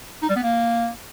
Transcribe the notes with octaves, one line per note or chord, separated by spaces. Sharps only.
D#4
G3
B3
A#3